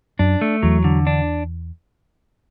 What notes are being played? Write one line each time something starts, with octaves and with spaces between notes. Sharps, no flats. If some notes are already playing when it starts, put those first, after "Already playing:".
F#2 D4
A3
E2 F#3
D3
D4